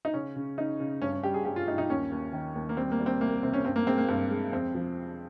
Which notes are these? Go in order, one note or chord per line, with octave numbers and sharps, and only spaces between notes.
D#4
C#3 C#4
C#3
C#3 D#4
C#3
G2 C#4
C#4
G3 G4
G#4
G2 G4
F4
G2 D#4
D#4
D#2 C#4
D#2
D#3
D#2
A#3
G3 C4
A#3
G3
C4
C2 A#3
C3 C4
C#4
G2 C4
A#3
G#3 C4
A#3
G2 C4
G#3
F2 C4
F3